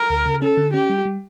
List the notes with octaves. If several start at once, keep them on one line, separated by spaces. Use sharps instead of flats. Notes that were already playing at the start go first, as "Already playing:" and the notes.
Already playing: A#4
D2
C#3
C#4 A4
D3
C#4 G4
G3
G3